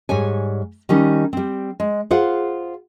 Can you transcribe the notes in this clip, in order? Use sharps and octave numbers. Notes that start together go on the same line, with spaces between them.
G#2 G3 C#5 G#5
D#3 G3 C#4 D#4
G3 C4
G#3
F4 G#4 C5 F5 F#5